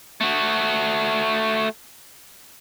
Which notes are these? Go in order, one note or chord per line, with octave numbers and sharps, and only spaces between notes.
A3 F#4